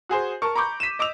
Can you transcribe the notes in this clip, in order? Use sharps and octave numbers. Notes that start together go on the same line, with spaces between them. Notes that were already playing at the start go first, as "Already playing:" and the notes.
F#4 G#4 C5
A#4 A5 C#6
A#5 B5 C#6 D6 G6
B6 D#7 E7
D#5 D6 E6 F7